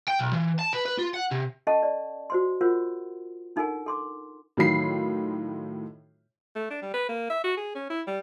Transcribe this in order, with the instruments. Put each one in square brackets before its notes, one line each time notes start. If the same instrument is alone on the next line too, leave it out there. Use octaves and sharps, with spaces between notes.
[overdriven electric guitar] G5
B1
E3
A5
B4
B4
F4
F#5
C3
[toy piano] C#4 A4 D#5 F#5 A5 C#6
D5
F#4 C5 C6
F4 A#4 C5 C#5 F#5
D4 D#4 A4 A#4 F#5 G#5
A4 C6 D6
[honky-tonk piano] A2 D#3 F#3 F4 B5 C7
[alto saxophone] A3
D4
G3
B4
A#3
E5
F#4
G#4
C#4
E4
G3